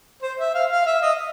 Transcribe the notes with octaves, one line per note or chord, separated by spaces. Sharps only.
C5
E5
F5
F5
E5
D#5